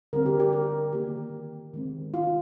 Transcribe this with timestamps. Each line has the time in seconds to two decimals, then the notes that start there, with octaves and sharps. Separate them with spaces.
0.13 D3 G3 C4 A#4
0.26 G4
0.40 G4
0.53 A#4
0.93 D#3 A#3 G4
1.74 D#3 G#3 C4
2.14 F4